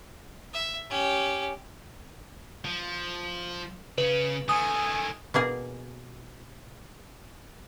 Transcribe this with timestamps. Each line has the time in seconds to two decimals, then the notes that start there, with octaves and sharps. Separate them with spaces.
0.53 E5
0.90 C#4 G4
2.65 F3
3.98 C#3 C#4 B4
4.49 D#3 A3 G#5 D#6
5.34 B2 A#3 G#4 A#4